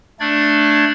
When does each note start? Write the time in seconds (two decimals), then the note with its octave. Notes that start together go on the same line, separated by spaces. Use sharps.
0.20 A3 D4 D5 G#6